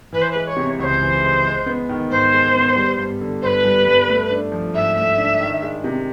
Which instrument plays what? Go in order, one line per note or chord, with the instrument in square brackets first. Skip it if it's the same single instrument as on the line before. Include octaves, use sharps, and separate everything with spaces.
[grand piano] E3 [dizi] B4
[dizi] C5
[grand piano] G#3 [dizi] B4
[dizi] C#5
[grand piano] C3
[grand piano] C#2 [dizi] C#5
[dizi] C5
[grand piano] E3
G#3
G#3
B3
D#3
[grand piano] G#2 [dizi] C5
[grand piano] G#3
B3
G3
G2
D3
[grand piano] G2 [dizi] B4 C5
[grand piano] G3
G2
A3
D4
F3
[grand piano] G#2 [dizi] E5
[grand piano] A3
D4
D#3
G#3
C3